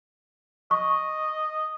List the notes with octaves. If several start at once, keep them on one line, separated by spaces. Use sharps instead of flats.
D#5 C#6